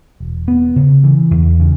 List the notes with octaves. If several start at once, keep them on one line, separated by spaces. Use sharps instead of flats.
E1
B3
C#3
E3
E2
C#3